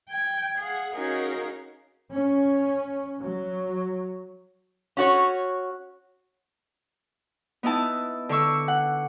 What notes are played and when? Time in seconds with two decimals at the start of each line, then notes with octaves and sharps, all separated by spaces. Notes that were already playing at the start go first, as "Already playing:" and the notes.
0.11 G5 G#6
0.58 G#4 F5 F#5
0.94 C#4 D#4 F#4 G#4 A#4 F5
2.12 C#4
3.20 F#3
4.97 C#4 F#4 C#5
7.63 B3 D#4 E4 A5
8.29 D3 D4 C#6 E6
8.68 F#5